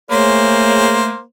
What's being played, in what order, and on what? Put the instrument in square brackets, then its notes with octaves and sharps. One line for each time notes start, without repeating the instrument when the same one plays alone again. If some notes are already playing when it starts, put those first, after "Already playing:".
[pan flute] A3 [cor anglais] A#3 [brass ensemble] G#4 C#5 [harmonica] C5